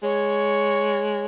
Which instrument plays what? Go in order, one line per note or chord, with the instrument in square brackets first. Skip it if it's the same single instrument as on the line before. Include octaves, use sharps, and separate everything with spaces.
[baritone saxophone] G#3 [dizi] C#5